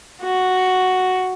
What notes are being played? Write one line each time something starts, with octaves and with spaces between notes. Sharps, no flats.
F#4